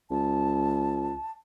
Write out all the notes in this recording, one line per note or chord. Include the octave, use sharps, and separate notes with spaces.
C#2 A5